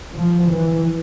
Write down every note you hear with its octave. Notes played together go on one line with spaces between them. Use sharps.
F3
E3